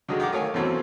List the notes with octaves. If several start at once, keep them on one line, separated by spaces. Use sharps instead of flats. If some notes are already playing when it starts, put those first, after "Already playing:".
D3 D#3 F#3 G#3
D#3 F#5 D6
A3 A#4 C#5 F5 G#5
E2 B2 F#3 A3 C4 C#4